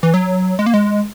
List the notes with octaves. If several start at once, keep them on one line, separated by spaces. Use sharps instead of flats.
E3
F#3
G#3
A#3
G#3